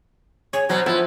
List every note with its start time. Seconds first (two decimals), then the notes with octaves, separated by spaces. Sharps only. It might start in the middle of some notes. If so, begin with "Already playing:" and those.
0.53 G#4 C#5
0.69 B2 F#3 C5
0.86 F3 B3 E4